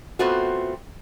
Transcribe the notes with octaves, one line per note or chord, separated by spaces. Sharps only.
A3 B3 C4 F4 F#4